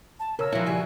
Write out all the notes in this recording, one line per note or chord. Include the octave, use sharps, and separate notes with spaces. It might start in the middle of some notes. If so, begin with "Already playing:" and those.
A5
C#3 A#4 C#5 E6
E3 F3 E4 F#4 F5
C#3 G3 E5 G#5